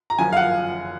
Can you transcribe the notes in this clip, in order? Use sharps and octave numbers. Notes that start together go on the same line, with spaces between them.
A#5
F#1 F#2 F3 G#5
F5
F#5